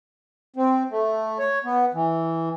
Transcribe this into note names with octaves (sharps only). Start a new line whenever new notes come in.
C4
A3
C#5
B3
E3